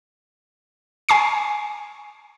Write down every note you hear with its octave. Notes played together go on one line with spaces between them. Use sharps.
G#5 C#6 C7